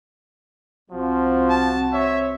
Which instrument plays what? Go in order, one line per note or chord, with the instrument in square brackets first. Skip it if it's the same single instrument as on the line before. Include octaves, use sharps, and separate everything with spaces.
[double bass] C2 C4 [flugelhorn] F3 [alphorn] F#4
[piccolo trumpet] A5
[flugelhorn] C#5 [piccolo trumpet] E5